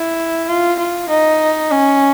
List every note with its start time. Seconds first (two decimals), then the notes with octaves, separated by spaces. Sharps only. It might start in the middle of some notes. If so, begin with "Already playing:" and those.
Already playing: E4
0.49 F4
0.79 F4
1.10 D#4
1.71 C#4